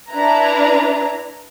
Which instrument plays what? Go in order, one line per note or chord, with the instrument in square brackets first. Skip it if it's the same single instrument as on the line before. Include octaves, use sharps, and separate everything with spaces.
[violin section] D4 E4 B4 A#5